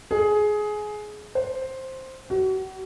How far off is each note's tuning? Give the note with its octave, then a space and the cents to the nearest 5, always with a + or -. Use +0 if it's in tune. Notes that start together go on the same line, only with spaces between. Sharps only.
G#4 +15
C5 +5
F#4 +35